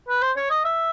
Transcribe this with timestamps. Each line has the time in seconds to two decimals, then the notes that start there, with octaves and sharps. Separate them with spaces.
0.08 B4
0.22 C5
0.36 C#5
0.50 D#5
0.65 E5